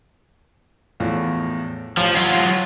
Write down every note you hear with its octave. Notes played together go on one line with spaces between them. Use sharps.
E2 A2 F3
A1 F3 C#5 F5
F#3 F4 G#6